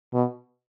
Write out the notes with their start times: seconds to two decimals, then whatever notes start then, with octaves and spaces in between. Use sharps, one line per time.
0.13 B2